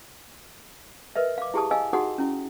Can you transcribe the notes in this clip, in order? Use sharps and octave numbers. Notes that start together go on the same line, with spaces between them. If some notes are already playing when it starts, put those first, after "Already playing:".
A#4 B4 D#5 E5
F5 D6
E4 G4 G#4 A5 D#6
D#5 F5 G#5 E6
D#4 F#4 G#4 F#5 D#6
C#4 E4